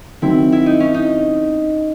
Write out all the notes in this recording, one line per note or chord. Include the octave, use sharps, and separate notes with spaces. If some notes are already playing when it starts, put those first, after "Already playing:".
D#3 F#3 C4 E4
E4
D#4
C#4
D#4